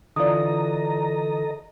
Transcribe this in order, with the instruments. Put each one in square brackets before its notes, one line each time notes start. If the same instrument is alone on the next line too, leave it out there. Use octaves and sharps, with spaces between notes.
[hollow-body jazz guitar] D3 E3 F4 [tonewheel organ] A4 D#5 A#5 [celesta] D5 D#6